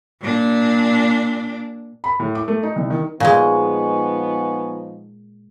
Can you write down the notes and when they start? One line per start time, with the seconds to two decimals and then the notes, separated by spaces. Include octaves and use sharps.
0.21 A#2 D4
2.04 B5
2.20 A2
2.35 D6
2.48 A3
2.63 D#4
2.76 C2
2.90 D#3
3.20 A#2 F3 G#3 B3 D#4 G#5 C#6